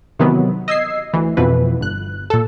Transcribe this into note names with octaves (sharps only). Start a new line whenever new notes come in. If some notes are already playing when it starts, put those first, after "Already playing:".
C3 D#3 E3 F#3 B3
D#5 E6 G#6 C7
D2 E3
F2 B2 E3 B4
G1 F#6
A#2 A4